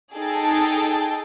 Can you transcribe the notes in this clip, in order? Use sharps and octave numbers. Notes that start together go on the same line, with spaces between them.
D#4 G#4 A4 G5 A5